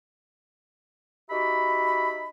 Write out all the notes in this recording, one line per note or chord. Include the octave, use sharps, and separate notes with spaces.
D#4 F#4 G4 E5 B5